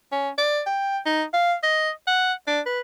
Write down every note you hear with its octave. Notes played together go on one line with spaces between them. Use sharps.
C#4
D5
G5
D#4
F5
D#5
F#5
D4
B4